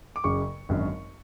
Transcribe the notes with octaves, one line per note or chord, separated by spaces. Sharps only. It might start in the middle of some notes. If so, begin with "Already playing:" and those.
D6
F#1 F#2 C#3 C#6
G#1 F#2 D3